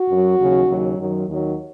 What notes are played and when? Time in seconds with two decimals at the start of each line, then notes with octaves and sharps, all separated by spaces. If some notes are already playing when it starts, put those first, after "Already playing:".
Already playing: F#4
0.09 F#2 F#3
0.38 D#2 C#3 F#3
0.67 D#2 C#3 F#3
0.98 F#2 D#3 F#3
1.27 D#2 D#3 F#3